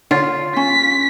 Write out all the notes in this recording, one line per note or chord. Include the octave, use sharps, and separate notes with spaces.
D3 D4 F4 C#5
C#4 B6